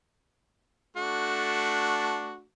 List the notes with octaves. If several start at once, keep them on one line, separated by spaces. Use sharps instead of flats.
A3 D4 F#4